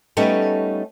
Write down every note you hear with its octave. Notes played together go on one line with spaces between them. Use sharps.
G3 A3 B3 C#4 D#4 A4